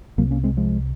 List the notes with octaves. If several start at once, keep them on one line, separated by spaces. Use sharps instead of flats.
C2 C3 F#3 A#3
A#3 C#4
G#3 C4
F3 G#3